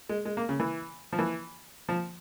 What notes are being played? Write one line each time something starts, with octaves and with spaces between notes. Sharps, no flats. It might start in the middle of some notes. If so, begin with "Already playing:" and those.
G#3
G#3
A#3
C#3
E3
F3
E3
F3